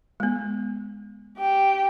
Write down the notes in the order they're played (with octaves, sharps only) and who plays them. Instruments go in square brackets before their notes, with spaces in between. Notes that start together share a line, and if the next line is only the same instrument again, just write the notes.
[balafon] G#3 B3
[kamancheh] G4 G5